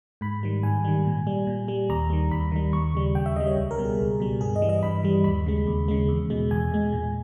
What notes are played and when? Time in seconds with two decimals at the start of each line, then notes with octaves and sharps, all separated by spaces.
0.21 G#2 B5
0.43 D#3 G3
0.63 G#2 G#5
0.84 D#3 G3
1.05 A#2
1.27 G3
1.47 A#2
1.68 G3
1.89 D#2 A#5
2.10 D#3 G3
2.31 D#2 B5
2.52 D#3 G3
2.73 D#2 C#6
2.94 C#3 G3
3.15 D#2 G5
3.26 E5
3.36 C#3 G3 D#5
3.47 C#5
3.57 C#2
3.71 A#4
3.78 B2 G3
3.85 G#4
3.99 C#2
4.20 B2 G3
4.41 G2 G#4
4.56 D#5
4.62 E3 G3
4.69 D#5
4.83 G2 B5
5.03 E3 G3
5.24 D#2 B5
5.46 C#3 G#3
5.67 D#2
5.88 C#3 G#3
6.08 E2
6.30 B2 G#3
6.51 E2 G#5
6.72 B2 G#3
6.93 A#2